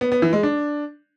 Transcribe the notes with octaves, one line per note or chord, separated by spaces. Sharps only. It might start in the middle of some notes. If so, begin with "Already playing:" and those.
B3
B3
E3
G#3
D4